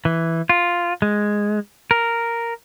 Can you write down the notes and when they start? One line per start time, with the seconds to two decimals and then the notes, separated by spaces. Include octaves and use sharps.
0.05 E3
0.49 F4
1.02 G#3
1.91 A#4